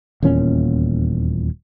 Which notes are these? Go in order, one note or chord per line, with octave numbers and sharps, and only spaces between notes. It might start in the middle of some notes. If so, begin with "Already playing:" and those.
D#1 E2 A#2 C#4